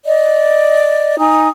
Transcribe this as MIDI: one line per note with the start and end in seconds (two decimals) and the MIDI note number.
0.05 1.17 74
0.05 1.17 75
1.19 1.47 63
1.19 1.47 80
1.19 1.47 87